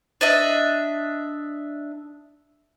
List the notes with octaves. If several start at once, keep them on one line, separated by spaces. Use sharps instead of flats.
D4 D#5 E5